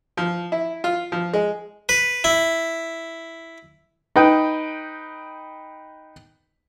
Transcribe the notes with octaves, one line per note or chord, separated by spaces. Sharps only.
F3
E4
F4
F3
G#3
B4
E4
D#4 B4 G5